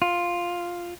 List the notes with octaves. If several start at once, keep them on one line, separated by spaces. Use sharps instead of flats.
F4